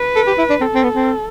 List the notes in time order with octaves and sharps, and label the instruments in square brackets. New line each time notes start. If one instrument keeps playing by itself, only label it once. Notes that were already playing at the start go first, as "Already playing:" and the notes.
Already playing: [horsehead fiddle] B4
[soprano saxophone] A4
G4
E4
D4
[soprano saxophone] C4 [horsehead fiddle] A4
[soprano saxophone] C4
B3
C4